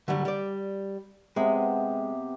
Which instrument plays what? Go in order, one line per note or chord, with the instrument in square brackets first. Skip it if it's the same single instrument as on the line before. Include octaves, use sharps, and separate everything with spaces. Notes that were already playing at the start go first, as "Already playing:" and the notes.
[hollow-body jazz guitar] D3 F#3 G3
G3 D5
[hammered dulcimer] C3 B3 [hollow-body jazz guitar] G#3